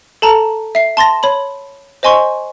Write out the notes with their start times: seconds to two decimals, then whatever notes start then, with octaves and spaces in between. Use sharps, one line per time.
0.22 A4 A5 A#5
0.75 E5 C7
0.97 A5 C6 A6 A#6
1.23 C#5 B5 F#7
2.03 C5 D#5 G#5 C6 C#6